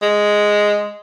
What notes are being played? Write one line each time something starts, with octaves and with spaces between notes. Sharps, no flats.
G#3